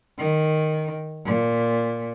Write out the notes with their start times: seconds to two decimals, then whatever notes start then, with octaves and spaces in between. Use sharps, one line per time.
0.19 D#3
1.25 A#2